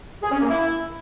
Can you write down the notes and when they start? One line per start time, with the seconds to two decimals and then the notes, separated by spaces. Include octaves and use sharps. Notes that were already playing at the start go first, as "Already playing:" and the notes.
0.23 G#4
0.32 C#4
0.40 A#3
0.49 E4